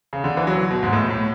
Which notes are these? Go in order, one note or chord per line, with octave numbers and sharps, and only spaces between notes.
C#3
D3
E3
F#3
B2
G#2
A2
A2